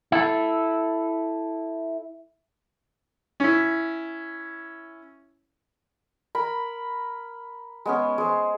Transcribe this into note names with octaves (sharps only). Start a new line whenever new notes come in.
E4 A4
C#4 E4
A#4 B5
G#3 B3 C#4
G#3 C5